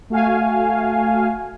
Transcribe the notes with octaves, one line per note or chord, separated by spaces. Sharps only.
A3 F#4 F5 G#5